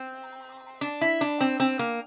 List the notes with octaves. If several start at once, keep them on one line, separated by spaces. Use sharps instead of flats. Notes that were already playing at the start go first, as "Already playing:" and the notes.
Already playing: C4
D4
E4
D4
C4
C4
A#3